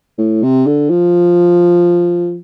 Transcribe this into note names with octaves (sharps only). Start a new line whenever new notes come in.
A2
C3
D3
F3